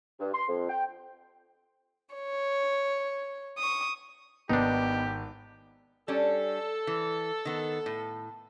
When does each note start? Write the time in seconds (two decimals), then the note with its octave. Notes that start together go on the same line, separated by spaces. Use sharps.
0.19 G2
0.33 C6
0.48 F2
0.69 G5
2.15 C#5
3.58 C#6 D#6
4.49 G#1 B3 D4 D#4 G4
6.08 G3 C#4 D4 A4
6.87 E3
7.45 D#3 B3
7.86 A2